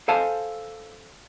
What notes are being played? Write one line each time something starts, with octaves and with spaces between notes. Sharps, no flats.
A4 C5 F5 G#5 A5